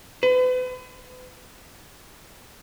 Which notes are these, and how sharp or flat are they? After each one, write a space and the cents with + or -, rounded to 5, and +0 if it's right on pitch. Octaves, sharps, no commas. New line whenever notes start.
B4 +40